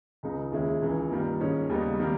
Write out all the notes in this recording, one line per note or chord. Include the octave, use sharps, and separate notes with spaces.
C#2 C#3 G#3 D#4
D#2 D#3 G#3 C#4 E4
C#2 C#3 E3
G2 D#3 G3 A#3
G#2 D#3 G#3 C#4
D#2 C#3 G3 B3 D#4
D#3 G3 A#3